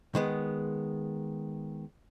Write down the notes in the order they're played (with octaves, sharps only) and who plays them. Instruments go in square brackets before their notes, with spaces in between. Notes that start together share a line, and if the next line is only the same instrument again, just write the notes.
[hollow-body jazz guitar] D#3 G#3 B3